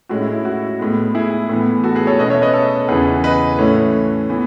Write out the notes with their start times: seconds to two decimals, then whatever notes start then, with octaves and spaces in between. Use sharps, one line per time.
0.09 A2 G#3 C#4 F#4
0.21 E4
0.33 E4
0.45 F#4
0.79 A2 G#3 B3
1.15 E4 G#4
1.49 A2 E3 B3
1.84 F#4 A4
1.95 G#4 B4
2.07 A4 C#5
2.19 B2 A3 C#4 B4 D#5
2.30 C#5 E5
2.42 B4 D#5
2.54 A4 C#5
2.88 E2 C#3 E3 G#4 B4
3.24 B4 D#5
3.59 A2 E3 A3 C#4
4.30 E3 B3